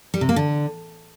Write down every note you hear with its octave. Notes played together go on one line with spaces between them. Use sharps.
G3
C3
A#3
D3